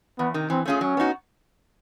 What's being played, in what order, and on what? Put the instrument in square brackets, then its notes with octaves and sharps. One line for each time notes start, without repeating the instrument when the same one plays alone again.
[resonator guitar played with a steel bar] E2 [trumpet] B3
[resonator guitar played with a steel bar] C3 D#3
[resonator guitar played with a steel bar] E3 [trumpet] C4
[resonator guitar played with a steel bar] A3 C#4 F4 G#4
[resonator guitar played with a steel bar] F#3 [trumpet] C#4
[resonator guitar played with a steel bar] B3 D#4 F#4